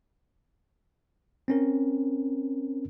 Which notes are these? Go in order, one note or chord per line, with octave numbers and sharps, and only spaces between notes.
C4 C#4 A#4